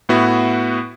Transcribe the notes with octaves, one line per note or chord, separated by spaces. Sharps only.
A2 B3 E4 F#4